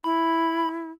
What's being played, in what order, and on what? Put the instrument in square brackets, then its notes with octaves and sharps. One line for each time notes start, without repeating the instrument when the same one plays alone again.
[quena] E4 [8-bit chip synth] B5